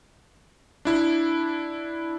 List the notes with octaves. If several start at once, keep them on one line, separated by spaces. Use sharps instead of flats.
D4 E4